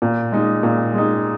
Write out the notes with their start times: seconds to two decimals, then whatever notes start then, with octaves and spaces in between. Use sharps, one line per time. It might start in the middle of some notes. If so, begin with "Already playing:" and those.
0.02 A#2
0.32 G#3 D#4
0.63 A#2
0.94 G#3 D#4